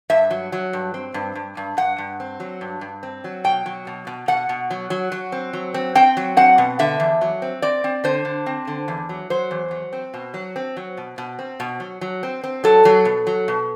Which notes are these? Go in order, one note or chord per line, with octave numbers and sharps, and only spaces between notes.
G2 E5
F#3
F#3
G2
C4
G2
G2
G2
G2 F#5
G2
C4
F#3
G2
G2
C4
F#3
B2 G5
F#3
B2
B2
B2 F#5
B2
F#3
F#3
F#3
C4
F#3
C4
C4 G5
F#3
C4 F#5
B2
D3 E5
E2
F#3
C4
C4 D5
C4
D3 C5
D3
C4
D3
E2
F#3
F#3 C5
E2
F#3
C4
B2
F#3
C4
F#3
B2
B2
C4
B2
F#3
F#3
C4
C4
F#3 A4
F#3
B2
F#3
B2